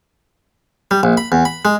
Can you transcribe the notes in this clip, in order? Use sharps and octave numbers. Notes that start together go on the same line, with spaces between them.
G3
A#1
B5
E2
B5
G#3